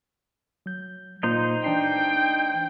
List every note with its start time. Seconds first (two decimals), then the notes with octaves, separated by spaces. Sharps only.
0.66 F#3 G6
1.23 A#2 A#3 D#4 C5
1.64 E3 D4 G5 C7